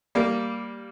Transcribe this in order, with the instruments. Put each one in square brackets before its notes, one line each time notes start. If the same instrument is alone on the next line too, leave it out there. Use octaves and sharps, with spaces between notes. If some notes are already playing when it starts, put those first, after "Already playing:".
[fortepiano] G3 A#3